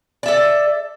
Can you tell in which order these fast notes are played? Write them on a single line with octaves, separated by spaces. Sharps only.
D5 E5 A4